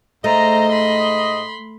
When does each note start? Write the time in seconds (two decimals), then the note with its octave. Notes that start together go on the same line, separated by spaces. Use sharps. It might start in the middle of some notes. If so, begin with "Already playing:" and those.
0.24 G#2 A3 C5 D#5 A#5
0.71 B5 C6